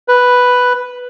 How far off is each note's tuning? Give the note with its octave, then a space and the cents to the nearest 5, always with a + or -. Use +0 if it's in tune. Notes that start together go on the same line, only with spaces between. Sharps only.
B4 +0